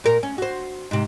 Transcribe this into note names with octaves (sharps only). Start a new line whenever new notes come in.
A#2 A#4
C#4
F#4 C5
G#2 C3